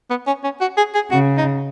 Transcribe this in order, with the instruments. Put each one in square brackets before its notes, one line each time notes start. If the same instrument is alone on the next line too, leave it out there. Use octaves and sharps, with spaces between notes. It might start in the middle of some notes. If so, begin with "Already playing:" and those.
[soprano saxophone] B3
C#4
C#4
F#4
G#4
G#4
[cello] C#3 [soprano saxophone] F#4
[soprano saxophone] D#4